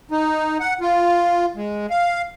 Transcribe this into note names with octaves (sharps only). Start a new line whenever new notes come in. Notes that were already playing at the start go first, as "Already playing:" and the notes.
D#4
F#5
F4
G#3
F5